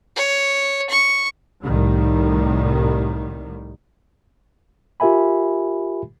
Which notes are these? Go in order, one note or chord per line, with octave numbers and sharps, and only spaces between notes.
C#5
C#6
C2 A2 D#3 G3
F4 G4 A#4 E5 G#5 B5